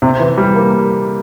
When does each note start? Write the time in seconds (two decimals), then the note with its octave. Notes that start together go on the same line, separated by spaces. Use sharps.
0.02 C3
0.19 E3
0.37 G3
0.55 A#3